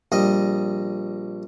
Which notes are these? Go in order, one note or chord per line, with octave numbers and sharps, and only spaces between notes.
A#1 G3 D#5